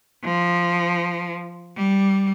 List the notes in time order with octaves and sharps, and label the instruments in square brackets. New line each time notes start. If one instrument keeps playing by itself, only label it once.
[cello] F3
G3